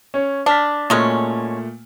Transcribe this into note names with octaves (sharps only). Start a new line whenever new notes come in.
C#4 C#5
D4 A5 F6 B6
A#2 F#3 G#3 A3 C#4